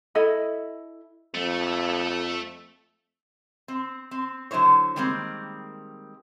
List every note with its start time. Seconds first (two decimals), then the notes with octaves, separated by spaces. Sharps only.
0.15 E4 A4 D#5 B5
1.34 F2 A3
3.68 C4
4.11 C4
4.51 D3 F#3 E4 C5 C#5
4.96 D#3 G3 G#3 A#3 C4